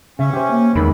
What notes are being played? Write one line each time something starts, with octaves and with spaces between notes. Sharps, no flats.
C#3 C#4 E5
G4 C5
A#3
E2 D#3 G#3 B5